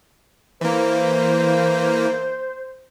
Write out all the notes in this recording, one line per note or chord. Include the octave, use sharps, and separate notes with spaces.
E3 A#3 C5